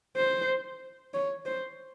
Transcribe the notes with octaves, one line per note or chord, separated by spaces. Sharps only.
C5
C#5
C5